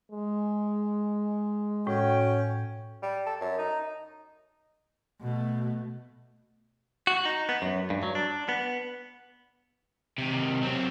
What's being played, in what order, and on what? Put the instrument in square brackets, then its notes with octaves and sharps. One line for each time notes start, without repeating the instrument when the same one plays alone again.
[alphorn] G#3
[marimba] A2 [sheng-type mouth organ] C#4 [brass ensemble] F#4 G5
[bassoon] G3
A4
F#2
D#4
[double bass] B2 A3
[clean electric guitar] F#4
D#4
B3
F#2
G2
F#3
D4
B3
[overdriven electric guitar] C3 D#3
F#3 C4